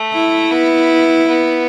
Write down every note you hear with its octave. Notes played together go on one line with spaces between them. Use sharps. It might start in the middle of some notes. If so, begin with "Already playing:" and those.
Already playing: A3
E4
B3
B3